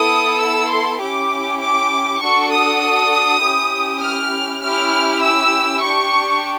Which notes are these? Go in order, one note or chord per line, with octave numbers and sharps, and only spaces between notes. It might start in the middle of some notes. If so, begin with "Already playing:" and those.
Already playing: B3 E4 A4 D#6
E6
C6
C#4 E4 G4 D6
D6
D4 F#4 A4 C#6
D#6
C#4 E4 G4
F6
C#4 E4 G4 F6
E6
D4 G4 C#6